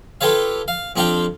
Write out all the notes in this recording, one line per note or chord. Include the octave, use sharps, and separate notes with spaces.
F4 G4 A4 B4 C#5 F5
F5
F2 C4 D4 F5 G5